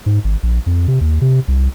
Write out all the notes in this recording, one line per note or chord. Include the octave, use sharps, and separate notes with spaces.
G#2
G#1
A#1
F2
C3
D#2
C3
C2